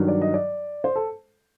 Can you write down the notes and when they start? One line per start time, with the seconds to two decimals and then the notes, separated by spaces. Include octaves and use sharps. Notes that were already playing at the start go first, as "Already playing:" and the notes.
Already playing: G2 D#3 F#3
0.08 D5
0.22 D#5
0.34 D5
0.84 C5
0.96 A4